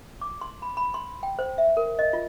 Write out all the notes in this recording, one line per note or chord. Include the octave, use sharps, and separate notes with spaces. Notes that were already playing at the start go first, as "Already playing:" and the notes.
D6
C6
B5
B5
C6
G5
C5
E5
A#4
D#5
F4